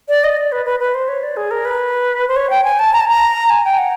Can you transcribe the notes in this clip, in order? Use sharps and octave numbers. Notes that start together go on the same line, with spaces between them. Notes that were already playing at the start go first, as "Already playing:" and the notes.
D5
D#5
D5
B4
B4
B4
C5
C#5
D5
G#4
A#4
B4
C5
C#5
G5
G#5
A5
A#5
A5
A#5
G#5
G5
F#5